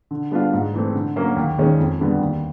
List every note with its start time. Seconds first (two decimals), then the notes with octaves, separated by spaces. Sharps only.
0.11 D3
0.31 G3 B3 D4 F4
0.53 G#2
0.74 E3 A3 C4
0.94 D3
1.16 F#3 A#3 C#4
1.36 D#2
1.58 D#3 G#3 C#4
1.79 F2
2.00 D3 G3 B3
2.20 D#2